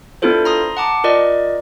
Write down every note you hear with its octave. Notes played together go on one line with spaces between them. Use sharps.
B3 D4 E4 F4 A4 C5
A#5 C6 D#6
F#5 A5 D6
F4 A#4 D5 D#5